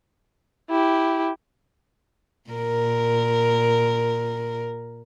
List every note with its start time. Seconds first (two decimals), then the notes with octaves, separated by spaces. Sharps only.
0.70 E4 G4
2.50 A#2 A#4